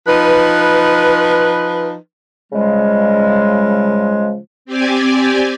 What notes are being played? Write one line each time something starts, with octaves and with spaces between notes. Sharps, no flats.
F3 D#4 B4
C#3 F3 G3 G#3
C4 G4 D5 G#5